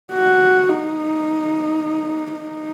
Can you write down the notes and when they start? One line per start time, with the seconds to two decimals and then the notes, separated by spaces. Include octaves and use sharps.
0.13 F#4
0.69 D#4
2.34 D#4